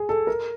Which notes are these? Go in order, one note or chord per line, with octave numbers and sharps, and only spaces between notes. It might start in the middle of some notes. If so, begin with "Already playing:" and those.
Already playing: G#4
A4
A#4